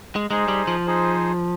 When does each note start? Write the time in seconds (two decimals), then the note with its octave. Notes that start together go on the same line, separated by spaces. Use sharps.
0.16 G#3
0.30 G#3 D#4 G#4 C5
0.48 G3
0.67 F3
0.87 D#4 G#4 C5